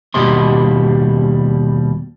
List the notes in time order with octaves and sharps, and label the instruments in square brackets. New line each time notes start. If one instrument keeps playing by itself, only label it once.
[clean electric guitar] D#2 B2 G3 D#5 C6